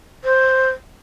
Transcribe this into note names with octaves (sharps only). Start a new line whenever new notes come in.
C5